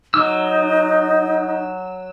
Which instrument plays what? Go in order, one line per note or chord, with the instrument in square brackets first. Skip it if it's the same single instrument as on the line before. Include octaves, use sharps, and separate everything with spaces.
[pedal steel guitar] F#3 E6 [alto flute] D#4